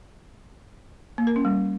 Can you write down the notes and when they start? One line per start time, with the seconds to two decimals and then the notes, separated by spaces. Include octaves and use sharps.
1.18 A#3
1.27 A#4
1.36 C#4
1.45 G3